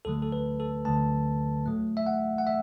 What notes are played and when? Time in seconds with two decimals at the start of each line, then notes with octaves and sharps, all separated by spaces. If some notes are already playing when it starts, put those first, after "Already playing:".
0.05 D2 D3 F#3 A3 A4
0.22 A4
0.32 B4
0.60 A4
0.85 D2 D3 F#3 A3 A5
1.66 A2 F#3 A3
1.97 E5
2.06 F#5
2.38 F#5
2.47 E5